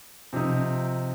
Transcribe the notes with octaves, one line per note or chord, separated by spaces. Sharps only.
C3 F3 C4 D#4